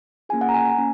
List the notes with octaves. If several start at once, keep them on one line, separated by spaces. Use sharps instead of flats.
A#3 C#4 F4 G#4 G#5
F#5
A#5
G#5
G#5
A#3 C#4